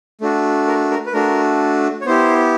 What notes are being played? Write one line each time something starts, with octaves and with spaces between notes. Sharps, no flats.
A3 D4 F#4
A#4
A#4
B4
A3 D4 F#4 A#4
C#5
B3 E4 G4 C5